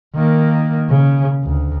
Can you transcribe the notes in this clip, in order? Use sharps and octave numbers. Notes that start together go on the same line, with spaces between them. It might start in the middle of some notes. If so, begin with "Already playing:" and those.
D#3 A#3
C#3
D2